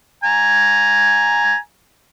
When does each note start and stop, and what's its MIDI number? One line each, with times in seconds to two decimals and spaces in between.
0.24 1.56 80
0.24 1.56 82